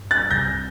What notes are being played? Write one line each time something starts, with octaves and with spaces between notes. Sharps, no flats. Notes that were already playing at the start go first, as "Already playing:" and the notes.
Already playing: G2
F#6 A6
C2 C3 G3 G6 A#6